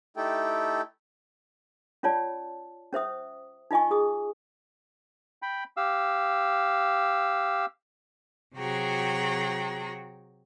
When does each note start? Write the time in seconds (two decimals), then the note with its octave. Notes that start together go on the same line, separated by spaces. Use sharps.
0.17 A3 D#4 E4 G4 A4 G5
2.03 C#4 F4 C#5 D5 A5
2.93 C#4 C5 E5 D#6
3.71 D#4 F4 D#5 G#5 C#6
3.91 G#4 D#6
5.42 G5 B5
5.77 G4 F5 E6
8.56 C3 F#3 F#4 G#4 G5 A#5